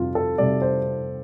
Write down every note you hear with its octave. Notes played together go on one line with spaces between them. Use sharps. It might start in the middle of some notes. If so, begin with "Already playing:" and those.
Already playing: F2 C3 G3 F4
A4
C3 G3 D5
C5